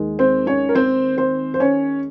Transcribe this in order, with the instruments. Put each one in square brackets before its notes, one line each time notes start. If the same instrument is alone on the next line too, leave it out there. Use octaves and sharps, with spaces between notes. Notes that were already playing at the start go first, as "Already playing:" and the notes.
Already playing: [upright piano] D#2 D#3 G#3
C4 C5
C#4 C#5
A#4
C4 C5
C4 C5
C5
C#4 C#5